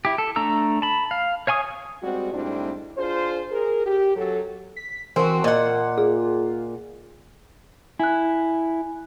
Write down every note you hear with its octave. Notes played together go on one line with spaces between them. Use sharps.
E4 G4
A4
A3 D4 A#5 E6
A5 B5
F5
C#5 F5 G#5 C#6 D#6
G3 G#3 C4 F#4
G#2 G3 A3 C4 D4 E4
D4 F4 G#4 C5
G#4 A#4
G4
F#2 F#3 A4
B6
E3 C4 F#4 A#4 G#5
A#2 A#3 D#5 F#5
F4 G#4
E4 G#5 F#6